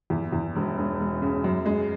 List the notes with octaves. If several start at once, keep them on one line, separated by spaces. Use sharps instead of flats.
E2
E2
E1
E1
E1
C#3
F#2
G#3